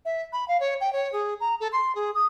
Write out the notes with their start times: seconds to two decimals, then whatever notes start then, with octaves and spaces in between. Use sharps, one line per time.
0.05 E5
0.32 B5
0.48 F5
0.60 C#5
0.81 G5
0.92 C#5
1.12 G#4
1.40 A#5
1.60 A4
1.72 C6
1.95 G#4
2.14 D#6